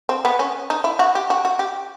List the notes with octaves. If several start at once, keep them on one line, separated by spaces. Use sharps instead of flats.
C4
B3
C#4
D#4
E4
F#4
G4
F#4
F#4
G4